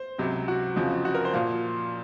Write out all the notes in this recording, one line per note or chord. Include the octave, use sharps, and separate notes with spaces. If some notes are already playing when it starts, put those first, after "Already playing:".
Already playing: C5
C#2 C3 F#3
F#4
F2 C#3 F3
F#4
A#4
C5
A#2 F3 F5